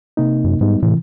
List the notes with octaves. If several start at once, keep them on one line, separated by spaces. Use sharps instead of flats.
C3 A#3 D#4
F#2
G#2 G3 B3 D#4
A2 C3 E3